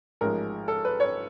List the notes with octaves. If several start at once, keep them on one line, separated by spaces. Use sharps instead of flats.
A1 G#2 F3 G#3 A#4
A4
B4
C#5